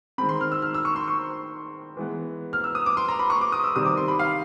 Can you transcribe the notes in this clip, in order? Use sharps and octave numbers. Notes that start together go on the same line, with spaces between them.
D#3 G#3 C4 B5
C6
F6
E6
F6
E6
C#6
C6
C#6
E3 G#3 B3
F6
E6
D#6
D6
C6
A#5
B5
C#6
D6
D#6
E6
C3 D#3 G3 C4 D#6
D6
C6
B5
F5